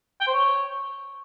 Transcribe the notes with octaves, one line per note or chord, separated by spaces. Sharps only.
G5
C5
C#5